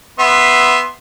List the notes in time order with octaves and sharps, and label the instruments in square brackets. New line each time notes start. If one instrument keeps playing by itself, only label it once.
[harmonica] B3 E5 C6